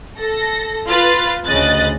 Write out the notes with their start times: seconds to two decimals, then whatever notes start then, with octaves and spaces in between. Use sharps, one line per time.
0.18 A4 A#6
0.88 F4 B4 A6
1.46 D2 C#3 D#5 F#6 A6